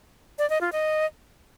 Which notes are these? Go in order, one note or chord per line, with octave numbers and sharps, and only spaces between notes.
D5
D#5
F4
D#5